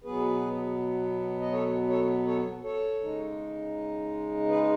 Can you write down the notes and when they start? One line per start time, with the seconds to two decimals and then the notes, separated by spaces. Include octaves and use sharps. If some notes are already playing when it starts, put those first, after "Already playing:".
0.04 B2 F#3 B3 G#4 B4
1.41 D#5
1.52 A4 C#5
1.89 A4 C#5
2.26 A4 C#5
2.63 A4 C#5
3.01 C#3 G#3 D#4
4.48 G#4 B4